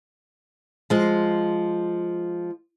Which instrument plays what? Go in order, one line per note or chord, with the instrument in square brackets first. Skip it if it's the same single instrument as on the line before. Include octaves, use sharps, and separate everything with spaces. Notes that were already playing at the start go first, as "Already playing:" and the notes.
[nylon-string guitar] F3 G#3